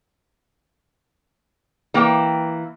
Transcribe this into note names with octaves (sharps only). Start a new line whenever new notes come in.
E3 A#3 G5